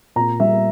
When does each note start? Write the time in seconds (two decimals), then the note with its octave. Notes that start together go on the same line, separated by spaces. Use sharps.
0.16 A#2 A#5
0.40 G3 E5